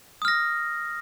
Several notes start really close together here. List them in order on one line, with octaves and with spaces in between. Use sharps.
D#6 F6 A#6